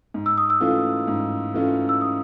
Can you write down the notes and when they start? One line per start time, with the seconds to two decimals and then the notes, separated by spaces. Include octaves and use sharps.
0.14 G#2
0.26 E6
0.38 D#6
0.50 E6
0.60 E3 A3 C#4 F4
1.08 G#2
1.54 E3 A3 C#4 F4
1.89 E6
2.01 D#6